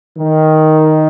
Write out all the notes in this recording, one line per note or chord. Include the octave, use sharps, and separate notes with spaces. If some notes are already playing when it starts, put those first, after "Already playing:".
D#3